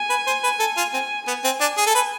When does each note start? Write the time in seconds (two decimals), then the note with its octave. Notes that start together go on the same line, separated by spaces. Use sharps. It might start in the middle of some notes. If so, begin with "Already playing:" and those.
Already playing: G#5
0.10 B4
0.27 C5
0.43 B4
0.59 A4
0.77 F4
0.94 C4
1.27 B3 G#5
1.44 C4
1.61 D4
1.77 G#4
1.86 A4
1.95 B4